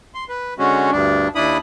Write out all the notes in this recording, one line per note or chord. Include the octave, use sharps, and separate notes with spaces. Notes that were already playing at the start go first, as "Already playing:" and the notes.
C6
B4
D3 G#3 C#4 F#4
D2 G2 D4
D#2 D4 E4 B5 D#6